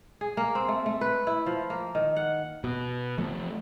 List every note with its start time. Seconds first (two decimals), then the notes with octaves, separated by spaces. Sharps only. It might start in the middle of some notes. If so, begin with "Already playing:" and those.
0.21 G#4
0.37 A#3
0.55 C4
0.68 A3
0.86 A3
1.01 B4
1.27 E4
1.46 F3
1.70 A#3
1.95 D#3
2.16 F#5
2.64 B2
3.18 F3 A3